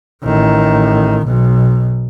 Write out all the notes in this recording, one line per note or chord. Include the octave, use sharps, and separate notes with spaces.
A1 D#3
B1 B2